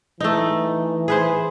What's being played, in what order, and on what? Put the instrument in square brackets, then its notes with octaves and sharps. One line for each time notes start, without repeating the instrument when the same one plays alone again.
[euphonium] E3 [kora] A3 D#4
[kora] G#4 B4 C5